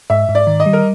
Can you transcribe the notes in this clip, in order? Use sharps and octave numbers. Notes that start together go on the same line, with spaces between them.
G#2 E5
G#2
D5
D#3
D#5
G3
A#4